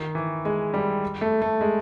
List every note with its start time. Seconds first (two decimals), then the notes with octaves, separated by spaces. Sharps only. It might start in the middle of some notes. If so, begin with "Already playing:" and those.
Already playing: D#3
0.15 E3
0.45 G#3
0.74 G3
1.21 A3
1.42 A3
1.61 G#3